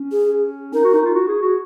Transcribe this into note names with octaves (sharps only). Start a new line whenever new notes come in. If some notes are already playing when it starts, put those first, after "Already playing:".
Already playing: C#4
G#4
D#4 A#4
F#4
D#4
F4
F#4
G#4
F#4